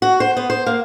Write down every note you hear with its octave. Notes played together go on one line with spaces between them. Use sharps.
F#4
C5
B3
C5
A#3